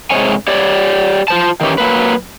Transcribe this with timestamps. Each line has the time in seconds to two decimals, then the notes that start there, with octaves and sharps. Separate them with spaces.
0.11 G#2 C3 G#3 C#5 G#5
0.48 G4 C#5 D5
1.28 F4 C5 A5
1.61 D#3 E3 C#4 G4
1.78 F#3 A#3 B4